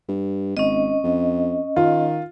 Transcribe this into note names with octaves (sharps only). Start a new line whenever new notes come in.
G2
G#1 C#4 D#5
F2
D#3 F4